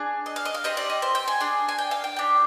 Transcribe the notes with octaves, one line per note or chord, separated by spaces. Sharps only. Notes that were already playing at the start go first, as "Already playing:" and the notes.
Already playing: D4 G#4
D#5
F5
D#5
F5
C4 G4 D#5
D5
D#5
C5
G5
G#5
D4 G#4
G#5
G5
F5
G5
D4 G4